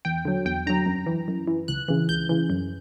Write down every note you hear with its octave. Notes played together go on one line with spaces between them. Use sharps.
E2 G5
D3 F#3
E2 G5
D3 F#3 A#5
F#2
E3
F#2
E3
C#2 F#6
C#3 E3
C#2 G6
C#3 E3
F#2